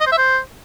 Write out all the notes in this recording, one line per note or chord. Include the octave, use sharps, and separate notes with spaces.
D#5
C5
E5
C5